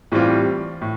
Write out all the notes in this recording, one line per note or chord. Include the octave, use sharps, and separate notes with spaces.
A2 E3 G3 C4 F4
A2